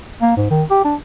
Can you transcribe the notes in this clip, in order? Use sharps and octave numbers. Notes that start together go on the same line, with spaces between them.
A#3
G#2
D#3
G4
D4